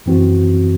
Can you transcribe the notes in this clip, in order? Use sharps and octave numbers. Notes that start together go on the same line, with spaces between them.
F#2 E3 C4 F#4